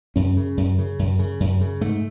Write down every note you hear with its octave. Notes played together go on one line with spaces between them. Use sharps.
F#2 C#4
C#3
F#2
C#3
F#2
C#3
F#2
C#3
G#2 A3